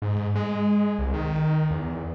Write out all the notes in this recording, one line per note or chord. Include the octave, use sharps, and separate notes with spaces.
G#2
G#3
C2
D#3
E2